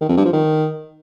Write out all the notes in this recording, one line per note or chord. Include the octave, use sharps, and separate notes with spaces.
D#3
F2
G2
F3
D#3